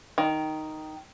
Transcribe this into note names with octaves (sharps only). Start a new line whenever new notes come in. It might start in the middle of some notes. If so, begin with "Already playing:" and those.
D#3